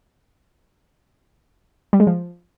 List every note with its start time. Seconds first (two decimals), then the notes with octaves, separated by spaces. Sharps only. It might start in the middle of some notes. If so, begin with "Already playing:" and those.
1.93 G3
2.00 G#3
2.07 F3